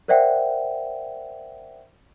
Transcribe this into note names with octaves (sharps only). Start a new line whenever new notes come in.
A#4 C5 D5 E5 F#5 G5